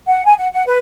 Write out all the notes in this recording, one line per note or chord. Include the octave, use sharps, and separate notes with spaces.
F#5
G#5
F#5
F#5
B4